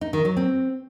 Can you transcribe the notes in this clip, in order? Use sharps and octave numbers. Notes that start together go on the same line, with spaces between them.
D#4
D#3
F#3
C4